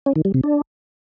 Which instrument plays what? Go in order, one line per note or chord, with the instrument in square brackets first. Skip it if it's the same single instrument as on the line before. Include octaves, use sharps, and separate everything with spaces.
[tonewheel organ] C#4
D#3
G3
C3
D4